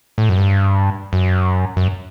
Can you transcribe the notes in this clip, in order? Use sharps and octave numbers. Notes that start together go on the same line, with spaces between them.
A2
F#2
G2
F#2
F#2